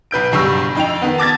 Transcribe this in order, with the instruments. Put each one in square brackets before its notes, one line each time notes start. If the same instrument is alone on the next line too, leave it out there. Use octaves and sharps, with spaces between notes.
[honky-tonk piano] B1 B4 G6 D7
F#1 B1 G2 C#6 E6
F2 D#4 G5 F7
D#3 B3
A5 D6 G#6 A6